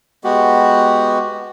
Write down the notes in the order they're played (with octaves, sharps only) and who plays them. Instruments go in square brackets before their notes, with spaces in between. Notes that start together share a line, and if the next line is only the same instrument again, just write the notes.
[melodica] G#3 B3 F#4 G4